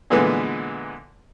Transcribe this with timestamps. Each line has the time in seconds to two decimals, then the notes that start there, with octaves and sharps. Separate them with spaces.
0.10 A#2 D3 E3 G#3 B3